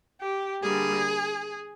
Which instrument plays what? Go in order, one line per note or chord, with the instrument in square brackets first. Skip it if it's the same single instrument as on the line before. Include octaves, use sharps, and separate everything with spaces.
[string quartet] G4
D3 G3 A#3 G#4